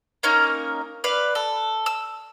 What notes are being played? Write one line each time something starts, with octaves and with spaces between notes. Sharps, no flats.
A#3 C#4 D#4 A#4
B4 D5 F5
A4
E6